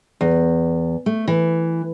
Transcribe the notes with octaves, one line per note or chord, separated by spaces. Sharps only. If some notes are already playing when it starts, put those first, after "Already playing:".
E2
A3
E3